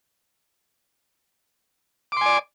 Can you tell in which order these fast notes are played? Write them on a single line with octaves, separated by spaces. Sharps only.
D6 C6 G#5 D5